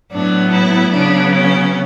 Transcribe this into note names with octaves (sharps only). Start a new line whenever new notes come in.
A2 F#3 B3 D4
E4
C#3 F#3 B3 D4
C#4